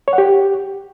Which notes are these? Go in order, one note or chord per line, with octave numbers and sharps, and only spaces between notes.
C#5
F#5
G4